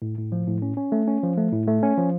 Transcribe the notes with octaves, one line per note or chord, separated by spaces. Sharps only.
A2
A2
F3
A2
C#4
C#4
A3
C#4
F3
A3
A2
A3
C#4
F3